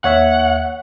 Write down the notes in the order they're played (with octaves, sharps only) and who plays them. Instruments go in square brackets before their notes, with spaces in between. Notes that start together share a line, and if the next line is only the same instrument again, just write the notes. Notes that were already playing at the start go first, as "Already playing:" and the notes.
[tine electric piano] D#2 C#5 E5 [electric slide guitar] F#5